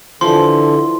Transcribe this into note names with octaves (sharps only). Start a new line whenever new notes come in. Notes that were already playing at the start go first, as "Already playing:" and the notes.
D3 E3 F3 C6